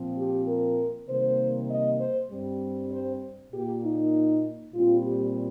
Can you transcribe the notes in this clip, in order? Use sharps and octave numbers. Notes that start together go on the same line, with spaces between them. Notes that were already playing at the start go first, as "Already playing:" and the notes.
Already playing: A#2 F3 C4
G4
A#4
C3 D#3 G3 A#3 C5
D#5
C5
G2 G3 C4
C5
A#2 A#3 G4
D#4
A#2 G3 C4 F4
G4